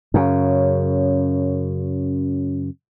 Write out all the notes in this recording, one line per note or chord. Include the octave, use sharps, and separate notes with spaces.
F#2 C#3